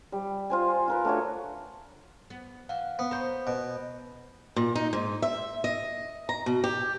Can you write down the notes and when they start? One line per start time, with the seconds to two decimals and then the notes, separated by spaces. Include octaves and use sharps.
0.12 G3
0.50 F4 C5 G#5
0.88 F4 A#4 B4
1.05 A3 D4 F#4 C#5
2.30 B3
2.69 E3 F5 F#5
2.99 B3
3.11 A#4 C5 C#5 B5 G6
3.47 B2
4.56 A#2
4.76 D#4
4.93 G#2
5.22 E5
5.64 D#5
6.29 A#5
6.46 B2
6.64 G4